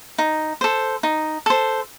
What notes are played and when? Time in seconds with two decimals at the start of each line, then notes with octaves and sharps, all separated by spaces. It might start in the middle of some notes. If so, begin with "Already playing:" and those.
0.18 D#4
0.61 A4 C5
1.03 D#4
1.46 A4 C5